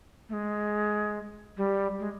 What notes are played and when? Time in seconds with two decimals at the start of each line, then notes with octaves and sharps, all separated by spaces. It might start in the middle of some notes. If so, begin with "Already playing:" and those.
0.29 A3
0.33 G#3
1.57 G3
2.00 G#3